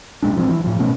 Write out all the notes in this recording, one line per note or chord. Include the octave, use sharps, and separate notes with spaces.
F#1 A#2 G#3 D4
A1 F3 A#3 C4
E3
A2 F3
B2 A3 B3 C#4